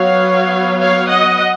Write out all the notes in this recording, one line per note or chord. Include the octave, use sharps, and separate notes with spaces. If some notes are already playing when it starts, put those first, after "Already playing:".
Already playing: F#3 B3 C#5 F5
C#5 F5
D#5 F#5